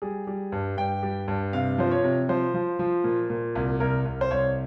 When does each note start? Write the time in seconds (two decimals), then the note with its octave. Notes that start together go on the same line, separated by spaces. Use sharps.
0.02 G3 G#4
0.27 G3
0.52 G2
0.77 G2 G5
1.03 G3
1.28 G2
1.53 C3 F5
1.78 F3 C5
1.91 C#5
2.04 C3
2.29 F3 C5
2.54 F3
2.79 F3
3.04 A#2
3.30 A#2
3.55 C2
3.80 C2 A#4
4.05 C2
4.21 C5
4.31 C2 C#5